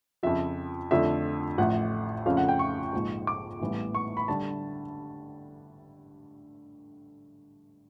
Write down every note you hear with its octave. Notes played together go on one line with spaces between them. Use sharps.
F2 C#3 F3 E5
F2 D3 F3 A3 E5
A1 A2 F3 F#5
F2 C#3 F3 A3 C#4 F5
F#5
G5
C#6
A#1 G#2 F3 G#3
D6
A1 A2 E3 G3 B3
C#6
B5
D3 G3 A5